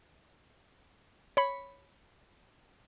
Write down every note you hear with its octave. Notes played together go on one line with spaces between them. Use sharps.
C#5 B5